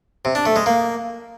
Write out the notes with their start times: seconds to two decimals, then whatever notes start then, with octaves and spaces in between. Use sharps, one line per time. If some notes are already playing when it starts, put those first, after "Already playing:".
0.25 C3
0.35 D4
0.46 A3
0.56 G#3
0.66 A#3